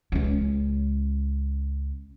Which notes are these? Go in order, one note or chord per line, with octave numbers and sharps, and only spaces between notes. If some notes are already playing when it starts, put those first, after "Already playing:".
C#2 C#4